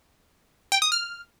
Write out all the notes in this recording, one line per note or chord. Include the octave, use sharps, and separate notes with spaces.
G5
D#6
F6